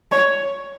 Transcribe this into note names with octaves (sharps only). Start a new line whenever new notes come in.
C#5